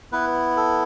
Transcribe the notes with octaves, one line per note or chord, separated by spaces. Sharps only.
B3 E4 B4
A4